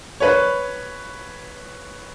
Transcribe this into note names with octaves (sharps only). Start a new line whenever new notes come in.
B4 C#5